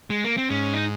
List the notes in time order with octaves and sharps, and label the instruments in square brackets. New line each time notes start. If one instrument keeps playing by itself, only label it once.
[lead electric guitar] G#3
A#3
C4
[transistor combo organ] G#2 [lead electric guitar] C#4
[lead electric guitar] D#4